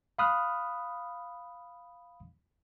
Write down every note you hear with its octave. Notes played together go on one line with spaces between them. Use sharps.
F5 B5 D#6 F6 F#6